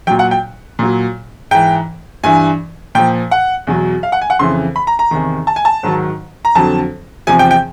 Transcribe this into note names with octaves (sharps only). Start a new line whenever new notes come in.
A#2 F#3 G5
F#5
G5
A#2 F#3
G#2 E3 G5
G2 E3 G#5
A#2 F3 G5
F#5
E2 B2 F#3
F5
F#5
G#5
F#5
F2 C#3 E3 C6
B5
A#5
A#5
E2 C3 D#3
A5
G#5
A5
G#2 D#3 F#3
A#5
F2 D3 F#3 A5
E2 C3 F3 G#5
G5
G5